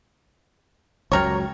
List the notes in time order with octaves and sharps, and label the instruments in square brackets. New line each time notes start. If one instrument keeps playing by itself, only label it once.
[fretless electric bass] C#2 F#2 F#3 [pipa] G3 A#4 C#5